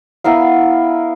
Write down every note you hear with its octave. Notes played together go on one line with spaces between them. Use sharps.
B3 E4 A#4 F5